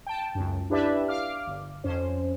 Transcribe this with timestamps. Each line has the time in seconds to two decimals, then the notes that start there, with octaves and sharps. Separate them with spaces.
0.07 G5 A5
0.35 C#2 F#2
0.70 D4 E4 G4 B4 D5 E5
1.08 F5 D6 F6
1.47 G1
1.84 F2 C#4 C5